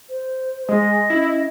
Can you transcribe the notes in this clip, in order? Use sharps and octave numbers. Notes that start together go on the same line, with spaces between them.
C5
G#3 D#5
C#4 E4